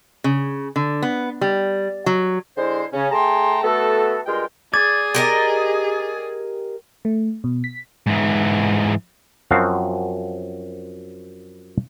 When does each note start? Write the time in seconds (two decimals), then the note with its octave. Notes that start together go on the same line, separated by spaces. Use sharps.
0.24 C#3
0.76 D3
1.02 B3
1.41 G3
2.06 F#3
2.57 D3 G#3 E4 C5
2.93 C#3 C#4
3.12 A3 G#4 G5 A5 A#5 C6
3.63 A3 B3 F#4 A4
4.27 G2 G#3 F4 A#4 G5 C6
4.74 G#4 D5 G#6
5.14 G4 A#4 D#5
7.05 A3
7.44 B2
7.64 B6
8.07 G#2 E3
9.51 F#2 F3 C4 F#4 F5